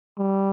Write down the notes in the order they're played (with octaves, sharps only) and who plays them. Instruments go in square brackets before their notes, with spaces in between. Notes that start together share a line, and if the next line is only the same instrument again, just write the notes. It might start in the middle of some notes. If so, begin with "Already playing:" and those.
[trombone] G3